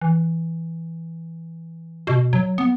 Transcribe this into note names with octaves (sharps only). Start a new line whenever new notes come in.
E3
B2
F#3
B3